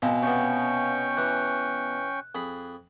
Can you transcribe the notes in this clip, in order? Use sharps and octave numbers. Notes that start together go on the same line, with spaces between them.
B2 C4 F5 G#5
C3 B3 C#4 G5 C#6
E3 F#6
F2 G#4 B5